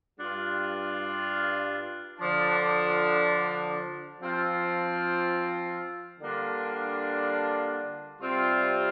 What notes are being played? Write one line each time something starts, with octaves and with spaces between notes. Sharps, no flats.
G2 G3 D4 F4
D3 F3 D4
F3 C4 F4
D3 G3 A#3 D4 F4
C3 G3 C4 F4